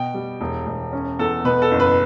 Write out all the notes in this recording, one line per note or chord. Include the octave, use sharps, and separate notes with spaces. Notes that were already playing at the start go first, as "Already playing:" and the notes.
Already playing: B2 G5
G3
E1
E1
C#4
E2 A4
B2 B4
A4
F#1
B4